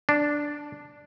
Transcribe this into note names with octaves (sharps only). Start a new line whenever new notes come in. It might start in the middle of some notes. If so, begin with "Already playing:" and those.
D4